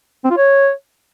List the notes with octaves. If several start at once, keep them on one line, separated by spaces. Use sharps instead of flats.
C4
F4
C#5